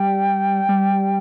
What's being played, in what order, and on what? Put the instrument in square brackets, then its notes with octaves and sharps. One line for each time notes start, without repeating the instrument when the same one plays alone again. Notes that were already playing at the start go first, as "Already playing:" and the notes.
Already playing: [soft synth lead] G3 [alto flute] G5
[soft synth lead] G3